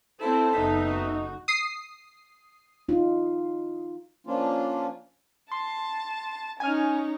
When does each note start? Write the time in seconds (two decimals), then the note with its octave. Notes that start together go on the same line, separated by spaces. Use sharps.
0.21 C4 E4 A4 C5
0.53 F#1 B3 C4 D#4 E5
0.88 F#4
1.48 D#6 C7
2.89 D#4 F4
4.27 F3 A#3 C#4 D4 F4
5.52 A5 C6
6.60 C#4 D#4 G#5 F6